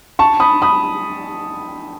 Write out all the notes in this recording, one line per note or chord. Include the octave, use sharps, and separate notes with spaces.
A5 C#6
B5 D#6
B5 D#6